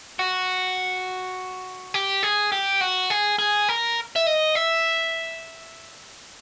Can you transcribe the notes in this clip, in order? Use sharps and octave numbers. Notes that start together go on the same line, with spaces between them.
F#4
G4
G#4
G4
F#4
G#4
G#4
A#4
E5
D#5
E5